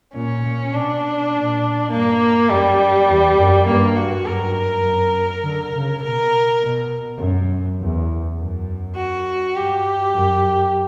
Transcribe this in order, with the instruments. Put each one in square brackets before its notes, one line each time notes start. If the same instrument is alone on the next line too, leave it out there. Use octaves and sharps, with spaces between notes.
[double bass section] A#2 [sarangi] C#4
[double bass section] A#2
[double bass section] B2 [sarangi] D4
[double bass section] A#2
[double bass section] G2 [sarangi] A#3
[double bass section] F#2 [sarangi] G3
[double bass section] E2
F#2
[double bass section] G2 [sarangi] A#3
[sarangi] F#4
[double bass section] F#2 [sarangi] A#4
[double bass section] F#2
D3
C#3
[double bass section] B2 [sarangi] A#4
[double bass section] B2
F#2
E2
F#2
[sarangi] F#4
[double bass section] G2 [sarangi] G4
[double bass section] F#2